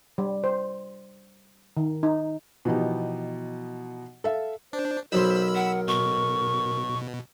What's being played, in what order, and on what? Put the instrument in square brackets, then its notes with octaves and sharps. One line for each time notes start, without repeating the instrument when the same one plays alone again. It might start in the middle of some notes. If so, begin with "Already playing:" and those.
[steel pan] G3
C5
D#3
D#4
[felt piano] B2 E3 F3 B3 D#4 G4
A4 E5 F5
[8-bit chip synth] D4 [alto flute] C5
[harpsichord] B1 F#3 C6 [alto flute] A#4 [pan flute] C5 [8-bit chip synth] B5 E6
[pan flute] F#5
[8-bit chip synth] B2 [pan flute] C#6